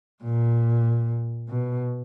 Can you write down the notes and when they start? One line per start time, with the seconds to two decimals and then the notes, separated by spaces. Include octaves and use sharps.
0.23 A#2
1.48 B2